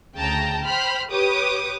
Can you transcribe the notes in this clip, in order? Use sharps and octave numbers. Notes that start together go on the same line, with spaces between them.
D2 C#3 G5 A5 A#5
C5 G5 B5 F6 B6
G4 B4 C#5 D6 D#6